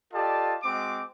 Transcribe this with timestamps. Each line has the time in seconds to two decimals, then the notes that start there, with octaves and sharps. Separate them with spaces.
0.13 F4 G4 A4 D5 D#5 A5
0.63 G#3 C4 F#4 D6